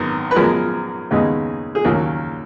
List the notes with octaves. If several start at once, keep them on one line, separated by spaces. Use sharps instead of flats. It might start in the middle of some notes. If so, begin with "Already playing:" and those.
Already playing: G#1 F#2 D#3 B3
B4
F#2 F3 G#3 B3 A#4
D#2 C#3 G#3 B3 D#4
G#4
D#2 C#3 F#3 A#4